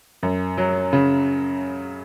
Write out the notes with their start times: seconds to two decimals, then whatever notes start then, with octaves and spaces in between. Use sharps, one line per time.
0.23 F#2
0.57 F#3
0.93 C#3